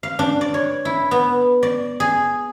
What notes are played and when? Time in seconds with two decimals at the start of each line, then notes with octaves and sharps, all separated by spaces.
0.03 F5
0.19 D4
0.41 D5
0.54 C#5
0.85 E4
1.11 B3
1.63 D5
2.00 G#4